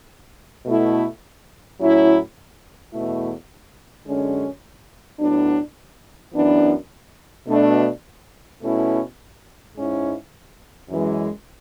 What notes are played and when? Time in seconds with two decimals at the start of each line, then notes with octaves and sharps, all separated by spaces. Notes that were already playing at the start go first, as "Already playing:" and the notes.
0.66 B2 A3 E4
1.79 A2 F#3 C#4 E4
2.93 E2 B2 A3 E4
4.06 F#2 D3 G#3 C#4
5.20 A2 F#3 B3 D4
6.34 F#2 E3 B3 D4
7.48 B2 A3 D4
8.62 B2 A3 C#4 E4
9.75 G#2 G#3 C#4 E4
10.89 F#2 E3 G#3